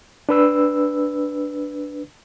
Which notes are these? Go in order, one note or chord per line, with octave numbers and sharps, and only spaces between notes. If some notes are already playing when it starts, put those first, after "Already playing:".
D4 B4 E6